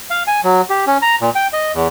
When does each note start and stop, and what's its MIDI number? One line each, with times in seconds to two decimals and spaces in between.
0.10 0.23 77
0.27 0.41 80
0.44 0.61 54
0.70 0.85 67
0.87 0.98 61
1.02 1.16 82
1.21 1.30 46
1.35 1.47 79
1.53 1.72 75
1.74 1.88 40